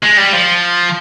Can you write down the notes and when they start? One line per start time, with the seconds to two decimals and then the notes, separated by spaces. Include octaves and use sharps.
0.04 G#3
0.18 G3
0.33 F3